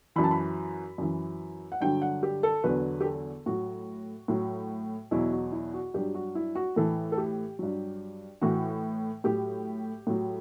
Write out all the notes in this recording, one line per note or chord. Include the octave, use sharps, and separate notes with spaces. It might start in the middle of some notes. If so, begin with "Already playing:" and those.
F#2 E3 B5
A5
B5
F#2 E3
F#5
G2 D3 F#3 G5
F#5
G4
A4
E2 D3 F#3 B4
G4
A4
A2 F#3 F#4
A2 F#3
E2 B2 F#3 E4
F#4
E4
F#4
G2 F#3 G4
F#4
E4
F#4
A2 E3 A4
A4
G4
G2 F#3
A2 E3 F#4
A2 F#3 G4
A2 F#3